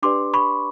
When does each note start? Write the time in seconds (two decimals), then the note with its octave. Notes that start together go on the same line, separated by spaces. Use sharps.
0.02 D4 G4 B4 D5 C6 D6
0.34 B5 C#6